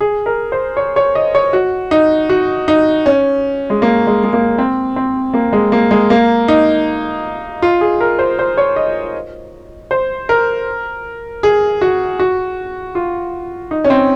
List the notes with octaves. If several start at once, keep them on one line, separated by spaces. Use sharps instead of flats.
G#4
A#4
C5
C#5
C#5
D#5
C#5
F#4
D#4
F#4
D#4
C#4
G#3
A#3
G#3
G#3
A#3
C4
C4
A#3
G#3
A#3
G#3
A#3
D#4
F4
G#4
A#4
C5
C5
C#5
D#5
C5
A#4
G#4
F#4
F#4
F4
D#4
C#4
C4